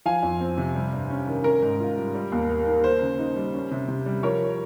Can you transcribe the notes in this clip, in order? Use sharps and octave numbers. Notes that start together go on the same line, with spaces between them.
F3 F5 G#5
F2
C4
C3
G3
G2
C#4
D#3
C#4 A#4
G#2
F4
G3
G3
D#2
A#3
D#3
A#3 C5
C#3
D#4
G3
C#4
C3
C3
G3
F3 A#4 C#5